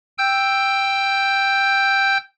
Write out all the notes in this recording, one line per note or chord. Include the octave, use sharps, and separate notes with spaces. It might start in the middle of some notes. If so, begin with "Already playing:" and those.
G5 E6 G6